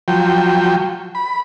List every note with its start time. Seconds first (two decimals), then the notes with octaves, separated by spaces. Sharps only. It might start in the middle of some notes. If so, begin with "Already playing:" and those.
0.08 F3 F#3 G5
1.15 B5